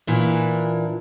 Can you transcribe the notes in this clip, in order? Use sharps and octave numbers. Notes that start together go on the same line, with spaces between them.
A#2 E3 D4